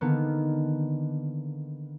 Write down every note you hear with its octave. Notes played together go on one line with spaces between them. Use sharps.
D3 D#3 A#3 B3